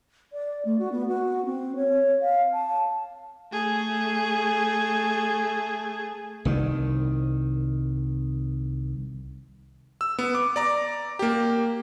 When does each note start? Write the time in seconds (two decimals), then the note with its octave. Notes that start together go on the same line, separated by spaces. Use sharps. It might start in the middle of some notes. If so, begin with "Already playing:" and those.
0.33 D5
0.65 A3
0.79 F#4
0.92 B3
1.08 F#4
1.45 C4
1.76 C#5
2.21 F5
2.54 A5
3.53 A3 G#4
6.45 C2 D#3
10.01 E6
10.19 B3
10.35 D6
10.56 D5 A#5 D6
11.19 A#3 G4